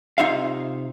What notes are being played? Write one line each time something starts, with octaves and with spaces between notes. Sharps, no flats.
C3 D#4 F4 E5 F5